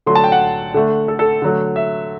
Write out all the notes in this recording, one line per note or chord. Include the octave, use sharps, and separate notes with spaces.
D3 F#3 A3 C6
A5
G5
F#5
D3 A3
A4
A4
D3 F#3 A3
E5